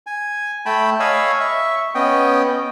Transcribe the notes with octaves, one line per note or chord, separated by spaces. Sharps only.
G#5
A3 G5 A5 B5
C#5 D#5 F5 G#5 B5 E6
E5 C#6
B3 C#4 D#5 G5